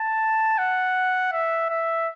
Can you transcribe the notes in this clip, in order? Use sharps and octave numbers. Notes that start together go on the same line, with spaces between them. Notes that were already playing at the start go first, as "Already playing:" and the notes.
Already playing: A5
F#5
E5
E5